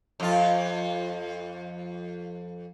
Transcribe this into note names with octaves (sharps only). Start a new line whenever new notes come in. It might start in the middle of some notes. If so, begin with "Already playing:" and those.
F2 F4